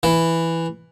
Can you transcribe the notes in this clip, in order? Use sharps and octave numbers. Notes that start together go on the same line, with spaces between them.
E3